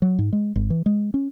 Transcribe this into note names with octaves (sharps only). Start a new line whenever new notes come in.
F#3
G#2
G#3
G#1
E3
G#3
C#4